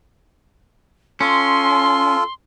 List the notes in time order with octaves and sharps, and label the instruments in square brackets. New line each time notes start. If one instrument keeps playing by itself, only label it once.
[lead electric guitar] C#4 [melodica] F4 A4 [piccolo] C6